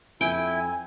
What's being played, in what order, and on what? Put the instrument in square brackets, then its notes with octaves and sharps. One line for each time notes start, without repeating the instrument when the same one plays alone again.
[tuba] F2 [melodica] E4 [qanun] G5 [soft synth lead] G#5